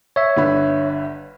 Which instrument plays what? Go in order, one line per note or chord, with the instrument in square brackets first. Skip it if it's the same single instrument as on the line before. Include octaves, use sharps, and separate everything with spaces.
[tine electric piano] C#5 E5
[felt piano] G1 D3 B5